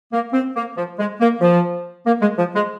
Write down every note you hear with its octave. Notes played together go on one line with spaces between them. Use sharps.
A#3
C4
A#3
F3
G#3
A#3
F3
A#3
G#3
F3
G#3